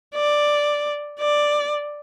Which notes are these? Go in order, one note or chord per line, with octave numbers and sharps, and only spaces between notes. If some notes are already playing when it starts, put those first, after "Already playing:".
D5
D5